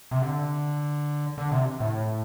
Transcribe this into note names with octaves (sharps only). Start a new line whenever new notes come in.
C3
D3
D3
C3
A2